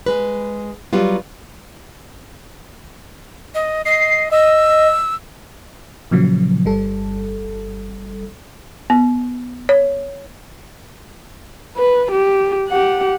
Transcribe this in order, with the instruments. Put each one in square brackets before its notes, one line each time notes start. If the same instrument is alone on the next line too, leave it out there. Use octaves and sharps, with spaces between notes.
[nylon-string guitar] G#3 B4
F#3 G3 B3 F4
[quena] D#5
[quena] D#5 [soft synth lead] C7
[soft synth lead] D#5 [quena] E6
[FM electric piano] A#2 C#3 F3 F#3
G1 G3 A4
[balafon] B3
C#5
[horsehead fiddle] B4
G4
G4 F#5